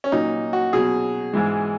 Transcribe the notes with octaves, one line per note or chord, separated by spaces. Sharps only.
C#4
A#2 F#3 D#4
F#4
B2 F#3 G#4
G#2 E3 G#3